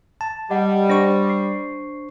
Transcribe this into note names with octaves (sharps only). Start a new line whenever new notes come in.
A5
G3 D#5 F#5
D4 C5 C#6 A#6
C7